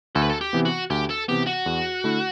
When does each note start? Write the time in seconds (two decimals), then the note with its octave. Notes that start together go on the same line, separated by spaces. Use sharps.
0.15 D2 A4
0.22 B4
0.30 A4
0.41 G4
0.53 C3 E3 B3
0.65 F#4
0.90 D2 G4
1.10 A4
1.28 C3 E3 B3 G4
1.47 F#4
1.66 E2
2.04 D3 A3 E4